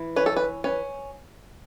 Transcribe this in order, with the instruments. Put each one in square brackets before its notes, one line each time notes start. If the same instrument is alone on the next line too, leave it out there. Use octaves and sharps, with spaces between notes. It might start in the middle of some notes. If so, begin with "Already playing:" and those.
Already playing: [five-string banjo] E3
C#4 B4
A4
B4
C#4 B4